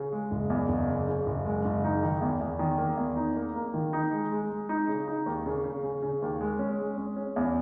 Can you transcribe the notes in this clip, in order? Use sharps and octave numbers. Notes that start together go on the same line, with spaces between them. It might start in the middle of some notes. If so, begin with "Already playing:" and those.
Already playing: C#3
G#3
F#1
E2
F#1
C#3
C#3
F#1
G#3
F#1
D#4
D#3
E2
E2
D#3
A#3
E2
D#4
A#3
A#3
D#3
D#4
G#3
G#3
G#3
D#4
C#3
D#4
D#2
C#3
C#3
C#3
C#3
D#2
G#3
C#4
G#3
C#4
C#4
E2